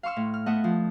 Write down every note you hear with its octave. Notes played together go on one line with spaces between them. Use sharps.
F5 C6 C#6 E6 F6
A2
F6
A3 B3 D#5 E5 F#5
F3